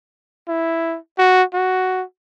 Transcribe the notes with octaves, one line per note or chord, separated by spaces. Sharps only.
E4
F#4
F#4